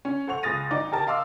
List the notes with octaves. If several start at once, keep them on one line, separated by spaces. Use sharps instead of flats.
C#4
A4 C5 F#5 C#6 F7
C#2 G#4 D#6 A6 A#6 D#7
G#1 D#4 D5 D6
G4 A#4 A5
D#5 F5 C6 D6 E6